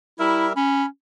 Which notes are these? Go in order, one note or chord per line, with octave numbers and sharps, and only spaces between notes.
G3 E4 A#4 E5
C#4 B5